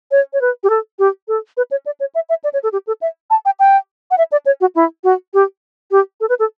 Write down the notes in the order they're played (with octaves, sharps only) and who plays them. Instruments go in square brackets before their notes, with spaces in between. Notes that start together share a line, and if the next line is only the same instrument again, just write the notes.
[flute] C#5
C#5
B4
G4
A4
G4
A4
B4
C#5
D5
C#5
E5
E5
D5
C#5
A4
G4
A4
E5
A5
G5
G5
F#5
E5
D5
C#5
F#4
E4
F#4
G4
G4
A4
B4
A4